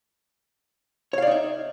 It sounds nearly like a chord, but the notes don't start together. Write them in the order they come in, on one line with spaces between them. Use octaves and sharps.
C#5 F5 D5 D#4 E5